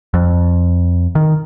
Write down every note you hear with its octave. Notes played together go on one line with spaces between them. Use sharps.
F2
D#3